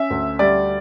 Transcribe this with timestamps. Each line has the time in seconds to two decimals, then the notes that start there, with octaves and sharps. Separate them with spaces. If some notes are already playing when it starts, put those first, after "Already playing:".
Already playing: C#4 E5
0.10 D2
0.39 G3 D5